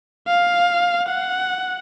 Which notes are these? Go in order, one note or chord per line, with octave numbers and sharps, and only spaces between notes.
F5
F#5